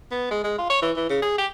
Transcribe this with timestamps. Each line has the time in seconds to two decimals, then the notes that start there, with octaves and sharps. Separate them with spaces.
0.11 B3
0.31 G#3
0.44 G#3
0.58 F4
0.70 C#5
0.82 E3
0.96 E3
1.10 C#3
1.22 G#4
1.38 G4